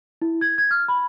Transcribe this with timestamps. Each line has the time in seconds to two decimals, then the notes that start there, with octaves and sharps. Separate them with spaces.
0.22 E4
0.41 G#6
0.58 G#6
0.71 F6
0.88 B5